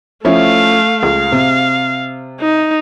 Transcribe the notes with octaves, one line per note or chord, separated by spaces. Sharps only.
F3 A3 C#4 E4 F5
C#2 F5
C3
D#4